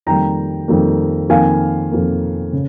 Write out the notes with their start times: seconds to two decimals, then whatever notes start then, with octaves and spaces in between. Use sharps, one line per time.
0.06 F2 D#3 G3 A#3 G5 A#5
0.68 F2 D#3 G3 A#3
1.29 F2 D#3 A#3 F5 G#5
1.91 F2 D#3 A#3
2.53 C#3